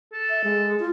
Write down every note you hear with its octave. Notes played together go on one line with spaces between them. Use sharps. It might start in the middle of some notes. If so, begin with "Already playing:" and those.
A4
E5
G#3
F4